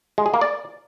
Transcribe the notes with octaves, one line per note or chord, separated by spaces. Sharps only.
G#3
G#4
A#3
D5